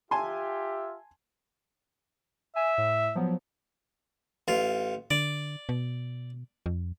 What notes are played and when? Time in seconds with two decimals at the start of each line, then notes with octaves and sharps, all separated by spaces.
0.11 F4 G4 E5 G#5 A5 C6
2.56 E5 G#5
2.78 A2
3.15 F3 F#3 B3
4.48 A1 F4
5.11 D3 D5
5.69 B2
6.66 F2